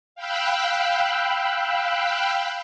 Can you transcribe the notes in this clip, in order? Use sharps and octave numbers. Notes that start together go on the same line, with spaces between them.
F5 G5 B5 E6 F#6